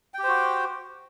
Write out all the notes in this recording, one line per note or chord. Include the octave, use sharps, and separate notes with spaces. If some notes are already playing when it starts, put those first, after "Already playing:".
F#4 G4 C5 G5